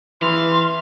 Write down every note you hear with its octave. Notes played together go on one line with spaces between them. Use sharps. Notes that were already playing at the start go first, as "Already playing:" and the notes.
E3 F5 C6